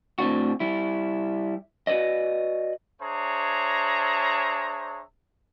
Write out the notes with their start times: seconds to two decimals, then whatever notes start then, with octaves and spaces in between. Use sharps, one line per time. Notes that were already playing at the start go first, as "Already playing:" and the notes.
0.19 A2 C4 D4 F#4
0.60 G3 E4
1.87 F#4 B4 C5 D5 D#5
3.01 D4 G#4 C5 C#5 E5 A#5